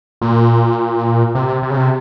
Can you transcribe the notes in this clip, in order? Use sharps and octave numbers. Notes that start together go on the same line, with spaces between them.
A#2
C3
C3
C#3
C3